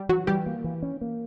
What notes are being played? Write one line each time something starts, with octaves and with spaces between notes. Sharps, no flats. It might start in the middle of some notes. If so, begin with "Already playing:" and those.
Already playing: G3 G4
E3 F#3 F#4
E3 G3 G4
A#3
E3
C#4
A#3